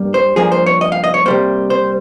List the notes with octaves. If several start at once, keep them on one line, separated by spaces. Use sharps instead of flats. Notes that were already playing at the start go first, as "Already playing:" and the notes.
Already playing: G2 G3 A#3
C5
G2 F3 A#3 G#4
C5
C#5
D#5
F5
D#5
C#5
C3 G3 A#3 C5
C5